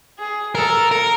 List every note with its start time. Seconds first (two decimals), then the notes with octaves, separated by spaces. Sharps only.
0.19 G#4
0.55 A4 A#4
0.91 A#4